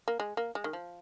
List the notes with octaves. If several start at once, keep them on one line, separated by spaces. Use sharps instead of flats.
A#3
G#3
A#3
G#3
D#3
F3